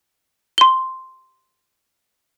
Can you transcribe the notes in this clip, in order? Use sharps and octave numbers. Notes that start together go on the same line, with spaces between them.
C6 G7